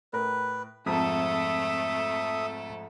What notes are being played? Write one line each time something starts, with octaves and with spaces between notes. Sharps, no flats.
A2 A#4 B4
F2 G#2 A3 C4 A4 E5 A5 D#6